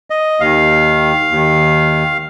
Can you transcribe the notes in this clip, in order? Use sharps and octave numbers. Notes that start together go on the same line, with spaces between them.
D#5
D#2 D#3 F5
D#2 D#3